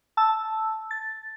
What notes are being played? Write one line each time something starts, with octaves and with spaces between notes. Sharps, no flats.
A5 E6
A6